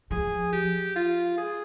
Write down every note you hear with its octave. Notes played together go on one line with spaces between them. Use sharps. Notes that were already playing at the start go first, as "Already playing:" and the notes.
F3 G#4
G4
F4
G#4